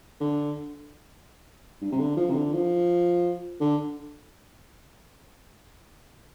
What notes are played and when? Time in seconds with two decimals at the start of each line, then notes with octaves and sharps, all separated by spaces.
0.20 D3
1.81 G2
1.92 C3
1.99 D3
2.17 F3
2.30 C3
2.34 D3
2.53 F3
3.60 D3